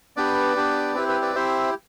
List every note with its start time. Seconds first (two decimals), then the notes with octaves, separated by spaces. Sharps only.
0.16 B3 D4 G4 B4 D5
0.56 B3 D4 G4
0.95 C4 E4 G4 B4
1.09 B4
1.21 B4 D5
1.35 C4 E4 G4 C5 E5